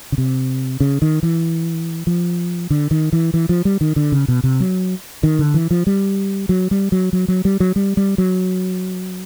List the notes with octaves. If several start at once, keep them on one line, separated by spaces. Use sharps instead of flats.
C#3
C3
C#3
D#3
E3
F3
D3
D#3
E3
E3
F3
G3
D#3
D3
C#3
B2
C3
F#3
D#3
D3
E3
F3
G3
F#3
G3
F#3
F#3
F#3
G3
F#3
G3
G3
F#3